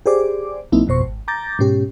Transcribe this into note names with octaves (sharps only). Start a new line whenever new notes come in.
G4 G#4 C5 D5 D6
A#1 F#3 A#3 C4 D#4 E4
G1 F2 B2 C5 C#6
G#1
A#5 D6 G6 A6 A#6
G#2 B2 C#4 G4